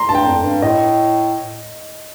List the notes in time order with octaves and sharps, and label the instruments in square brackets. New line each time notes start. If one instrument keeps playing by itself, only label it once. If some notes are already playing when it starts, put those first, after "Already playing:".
Already playing: [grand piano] A#5 C6
[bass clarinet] G2 [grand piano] A5
[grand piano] G5
[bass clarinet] F2
G2
[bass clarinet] A2 [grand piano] D#5